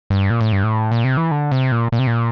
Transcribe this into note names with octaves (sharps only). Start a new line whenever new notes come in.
G2
A#2
A2
G2
A2
A#2
C3
E3
D3
C3
A#2
A#2
C3
A#2